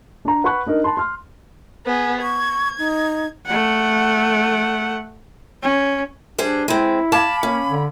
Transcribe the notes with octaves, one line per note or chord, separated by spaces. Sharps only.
D4 A#5
B4 F#5 B5 C#6 F#6
D4 D#4 A#4
A5 B5 C6
C6 F6
B3 G#4
C#6 G#6
D#4
A3 F#5
C#4
G3 D4 G#4 C5
G#3 C4 E4
F5 A5 B5 D6 G#6
A#3 C#4
D3